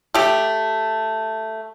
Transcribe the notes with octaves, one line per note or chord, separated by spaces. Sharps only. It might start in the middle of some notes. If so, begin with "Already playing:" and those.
A3 G4